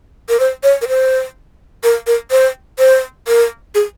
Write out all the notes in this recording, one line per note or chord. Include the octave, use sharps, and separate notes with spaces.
A#4
C5
C#5
A#4
C5
A#4
A#4
C5
C5
A#4
G#4